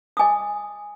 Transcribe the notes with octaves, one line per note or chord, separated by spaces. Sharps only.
D#5 G#5 D6 D#6